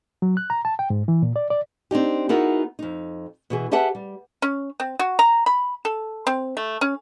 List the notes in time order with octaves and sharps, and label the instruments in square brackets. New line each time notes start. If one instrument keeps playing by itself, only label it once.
[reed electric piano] F#3
F#6
A#5
A5
G5
G#2
E3
A#2
D5
D5
[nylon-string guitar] C4 D4 D#4 G4
B3 D#4 E4 F#4 G#4 A#4
F2 D#4
B2 E3 G#4
G4 G#4 B4 E5 F#5 A5
G3
[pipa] C#4
C4
F#4
A#5
B5
A4
C4
A3
C#4